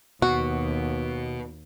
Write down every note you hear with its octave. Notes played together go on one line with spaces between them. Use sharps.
D#2 B2 F#4